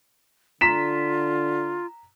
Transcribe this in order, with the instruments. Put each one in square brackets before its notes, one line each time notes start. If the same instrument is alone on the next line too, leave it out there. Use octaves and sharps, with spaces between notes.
[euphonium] D3 [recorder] F4 [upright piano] A#5 B6 E7